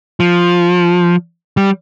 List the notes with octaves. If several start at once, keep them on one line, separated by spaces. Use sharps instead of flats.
F3
G3